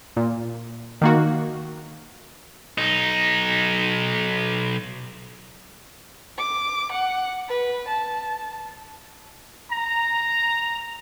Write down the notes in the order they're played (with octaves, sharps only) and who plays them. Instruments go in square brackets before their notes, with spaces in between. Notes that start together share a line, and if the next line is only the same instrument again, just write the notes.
[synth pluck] A#2
D#3 A#3 F#4
[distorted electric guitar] B1 D#4
[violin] D6
F#5
B4
A5
[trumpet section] A#5